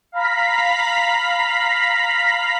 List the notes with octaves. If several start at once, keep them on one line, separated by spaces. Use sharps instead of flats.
F5 A#5 B5 B6